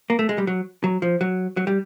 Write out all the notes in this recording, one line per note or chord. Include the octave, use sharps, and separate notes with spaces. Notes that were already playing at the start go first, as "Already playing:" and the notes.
A#3
A3
G#3
G3
F#3
F#3
F3
F#3
F#3
G3